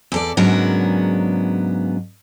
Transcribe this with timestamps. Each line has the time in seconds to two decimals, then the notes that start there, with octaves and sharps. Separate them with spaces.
0.12 E2 A4 D5
0.37 G#2 C#3 F#3 B3 D4 A#4